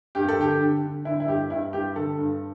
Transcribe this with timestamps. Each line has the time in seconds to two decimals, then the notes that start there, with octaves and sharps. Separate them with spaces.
0.15 G2 G4
0.29 A4
0.38 D3 G4
0.60 D3
0.82 D3
1.05 D3 E4
1.20 E4
1.28 G2 G4
1.50 G2 E4
1.73 G2 G4
1.96 D3 A4
2.18 G2